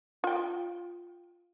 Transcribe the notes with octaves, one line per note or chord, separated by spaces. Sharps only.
F4 G5